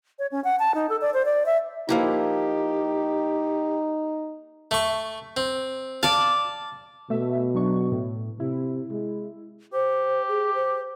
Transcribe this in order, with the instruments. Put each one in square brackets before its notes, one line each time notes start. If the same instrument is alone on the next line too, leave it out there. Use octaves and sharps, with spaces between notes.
[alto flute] C#5
C#4
F#5
A5
D#4
A4
D5
C5
D5
E5
[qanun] F3 A#3 E4 [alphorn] D#4 [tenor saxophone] G4
[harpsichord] A3 C#6
C4
[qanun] D5 A5 [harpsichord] F5
[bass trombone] B2 [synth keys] A3 E5
[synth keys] F#3 D4 C#6
A2
[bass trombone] C3 [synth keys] E4
[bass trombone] G#3
[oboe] G4 [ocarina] C5
[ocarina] G#4
C5